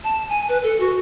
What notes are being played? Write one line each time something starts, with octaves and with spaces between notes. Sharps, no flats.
A5
G#5
B4
A4
F#4